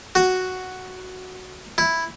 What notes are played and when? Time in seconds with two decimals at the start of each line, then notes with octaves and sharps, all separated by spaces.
0.15 F#4
1.78 E4